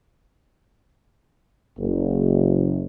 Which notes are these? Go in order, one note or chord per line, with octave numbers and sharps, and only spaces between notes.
F#1